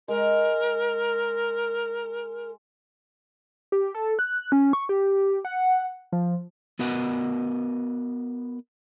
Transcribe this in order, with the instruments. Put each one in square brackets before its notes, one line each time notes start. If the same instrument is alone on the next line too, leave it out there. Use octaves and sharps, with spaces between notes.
[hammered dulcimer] G#3 [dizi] A#4
[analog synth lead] G4
A4
F#6
C#4
C#6
G4
F#5
F3
[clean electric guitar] B3 F#4 A#4 B4 D#5 F#5